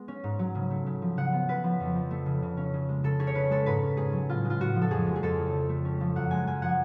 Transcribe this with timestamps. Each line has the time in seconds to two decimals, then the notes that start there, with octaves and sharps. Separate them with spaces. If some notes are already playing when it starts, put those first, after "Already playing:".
Already playing: G#3 B3
0.08 C#4
0.24 G#2
0.39 F#3
0.55 C#3
0.70 A3
0.86 C#3
1.02 F3
1.17 C#3 F#5
1.33 B3
1.48 C#3 B4
1.64 F3
1.80 F2
1.95 F3
2.11 A3
2.26 C#3
2.42 C#3
2.57 C#4
2.73 C#3
2.89 G#3
3.03 C#3 A4
3.19 C#4 G#4
3.27 C#5
3.35 C#3 B4
3.50 G#3 A4
3.66 G#2 B4
3.83 C#4
3.97 G#2 G#4
4.13 F#3
4.29 A2 F4
4.45 G#3
4.50 F4
4.60 A2 F#4
4.75 F3
4.81 A4
4.91 F2 G#4
5.07 G#3
5.16 G#4
5.23 F2 A4
5.38 C#3
5.54 C#3
5.69 A3
5.85 C#4
6.00 F3
6.15 F#2 F#5
6.31 G#3 G#5
6.47 F#2 G#5
6.62 F3 F#5